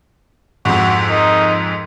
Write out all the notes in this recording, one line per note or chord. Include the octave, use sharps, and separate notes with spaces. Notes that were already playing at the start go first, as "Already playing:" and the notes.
F2 G#2 F#4
D#4 A#4